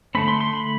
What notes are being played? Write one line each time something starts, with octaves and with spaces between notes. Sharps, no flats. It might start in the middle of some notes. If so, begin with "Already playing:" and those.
D3 A3 C4 B5
C6
C6
B5